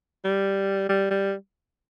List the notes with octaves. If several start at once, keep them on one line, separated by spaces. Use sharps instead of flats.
G3
G3
G3